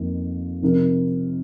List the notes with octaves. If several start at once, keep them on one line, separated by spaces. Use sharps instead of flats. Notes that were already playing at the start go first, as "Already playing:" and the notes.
Already playing: F2 D#3 A#3
C3 F3 C4 D#4 A#4